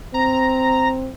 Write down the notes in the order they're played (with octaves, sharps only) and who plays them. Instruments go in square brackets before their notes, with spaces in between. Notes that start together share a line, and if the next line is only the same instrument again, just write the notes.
[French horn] C4 [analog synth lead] A#5